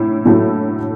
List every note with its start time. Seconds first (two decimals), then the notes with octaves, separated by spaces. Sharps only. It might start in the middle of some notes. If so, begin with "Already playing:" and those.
Already playing: A2 E4
0.25 A2 F#3 A3 E4